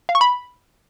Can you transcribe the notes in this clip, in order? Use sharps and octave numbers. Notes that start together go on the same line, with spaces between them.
F5
C#6
B5